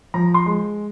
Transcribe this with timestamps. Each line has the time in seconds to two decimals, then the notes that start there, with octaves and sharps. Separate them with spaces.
0.14 F3 A#5
0.34 C6
0.46 G#3